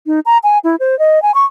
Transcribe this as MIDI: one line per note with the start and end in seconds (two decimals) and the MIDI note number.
0.07 0.20 63
0.26 0.38 82
0.44 0.59 80
0.64 0.76 64
0.80 0.98 72
0.99 1.22 75
1.22 1.32 80
1.35 1.45 85